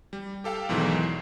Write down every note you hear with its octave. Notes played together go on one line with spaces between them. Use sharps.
G3
G4 A4 F5 G5 A5
B1 E2 G#2 D#3 E3 F#3
C7